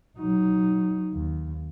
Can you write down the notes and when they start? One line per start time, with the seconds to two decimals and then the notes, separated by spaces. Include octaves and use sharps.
0.19 F#3 D#4
1.13 D#2